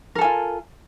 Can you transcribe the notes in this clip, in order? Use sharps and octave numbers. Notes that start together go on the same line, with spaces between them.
F4 A4 A#4 G#5